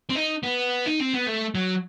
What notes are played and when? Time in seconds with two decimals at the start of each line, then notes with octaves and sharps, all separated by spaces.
0.10 C4
0.16 D#4
0.43 B3
0.86 D#4
1.00 C4
1.14 B3
1.27 A3
1.55 F#3